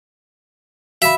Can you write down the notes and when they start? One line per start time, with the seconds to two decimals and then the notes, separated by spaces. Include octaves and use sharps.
1.02 F#4 E5 F5 B5